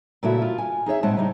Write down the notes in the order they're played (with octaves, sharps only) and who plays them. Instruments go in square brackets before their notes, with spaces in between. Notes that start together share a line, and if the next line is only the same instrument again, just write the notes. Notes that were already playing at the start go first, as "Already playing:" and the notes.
[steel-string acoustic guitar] A#2 C#3 A3 E4 F#4
F4
G#5
D#4 G#4 C#5 E5
A2 G#3 C4 F#5 A5
C#3 G3 D#4 E4